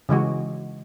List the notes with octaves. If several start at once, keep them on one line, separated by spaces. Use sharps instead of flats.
C#3 E3 G#3 F#4